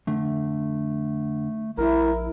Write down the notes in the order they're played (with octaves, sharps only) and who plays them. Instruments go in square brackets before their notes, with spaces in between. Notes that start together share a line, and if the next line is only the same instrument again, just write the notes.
[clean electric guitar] F2 D3 [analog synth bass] A3
[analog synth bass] A#1 [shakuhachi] E4 [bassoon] A#4